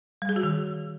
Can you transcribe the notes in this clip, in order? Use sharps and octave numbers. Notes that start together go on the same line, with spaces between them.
G3
G#4
F#4
D#3